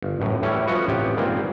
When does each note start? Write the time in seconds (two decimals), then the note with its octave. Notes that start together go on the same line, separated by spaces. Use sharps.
0.02 G1
0.20 A1 F#2 A2
0.42 A2 E3 G3 C#4 E4
0.67 F3 B3 C#4 F#4 D#5
0.88 A1 C3 B3 G4
1.16 G2 A#2 D#3 G#3 A#3 C4